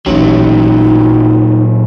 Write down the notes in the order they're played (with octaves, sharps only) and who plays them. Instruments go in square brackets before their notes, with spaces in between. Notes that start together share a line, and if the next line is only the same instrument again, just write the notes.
[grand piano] A1 [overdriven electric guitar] A#2 F#3 [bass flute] D#4